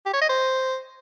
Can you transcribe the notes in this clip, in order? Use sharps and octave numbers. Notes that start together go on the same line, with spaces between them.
G4
C#5
D#5
C5